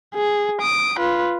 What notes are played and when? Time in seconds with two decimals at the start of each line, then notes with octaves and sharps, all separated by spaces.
0.15 G#4
0.62 D#6 D7
0.99 F4 B4